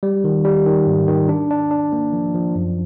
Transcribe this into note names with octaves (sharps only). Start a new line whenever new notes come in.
G3
D#3
G3
D#3
G#2
D#3
D4
D4
D4
A#3
F3
F3
F#2